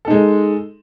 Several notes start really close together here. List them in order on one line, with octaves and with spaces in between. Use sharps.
A4 D#4 G#3